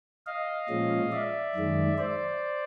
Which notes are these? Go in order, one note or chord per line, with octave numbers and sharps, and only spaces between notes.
D#5 F5
A#2 F3 G#3 C#4
D5 E5
F#2 D#3 G#3
C5 D5